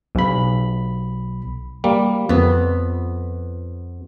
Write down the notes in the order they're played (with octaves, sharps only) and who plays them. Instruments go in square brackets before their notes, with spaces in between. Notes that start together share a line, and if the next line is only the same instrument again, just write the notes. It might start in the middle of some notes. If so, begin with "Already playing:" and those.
[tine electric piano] B1 B5
[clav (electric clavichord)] G3 A#3
[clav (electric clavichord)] F2 [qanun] B3